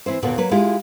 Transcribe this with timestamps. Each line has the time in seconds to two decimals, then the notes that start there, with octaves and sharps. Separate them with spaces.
0.06 E3 C4 E4 C5
0.22 D#2 A#2 D3 B3 F#4
0.38 F#3 A#3 B4
0.51 G#3 E4 F4 G4